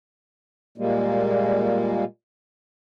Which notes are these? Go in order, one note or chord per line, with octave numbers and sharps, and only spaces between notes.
A#2 G3 G#3 A#3